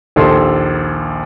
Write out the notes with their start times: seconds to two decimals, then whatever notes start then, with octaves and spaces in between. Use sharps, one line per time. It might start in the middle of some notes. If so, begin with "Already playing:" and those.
0.16 A#1 D#2 A4 C6 E6